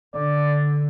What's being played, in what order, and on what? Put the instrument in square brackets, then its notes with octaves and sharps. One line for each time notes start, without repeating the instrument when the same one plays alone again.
[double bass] D3 [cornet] D5